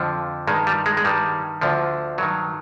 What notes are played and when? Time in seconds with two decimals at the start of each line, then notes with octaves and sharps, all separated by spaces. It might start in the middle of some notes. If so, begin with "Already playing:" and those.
Already playing: F2 D3 F3
0.47 G2 D#3 G#3
0.67 G3
0.86 G#3
0.97 G#3
1.04 G2 D#3 G3
1.61 D2 D3 F3
2.18 G2 D#3 F#3